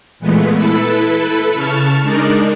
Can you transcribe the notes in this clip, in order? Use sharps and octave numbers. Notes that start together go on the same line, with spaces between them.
A#2 E3 G#3 A3 B3
E4 A4 B4 B5
C#3 A5 C#6 F6
G#3 D4 D#4 A#4 D5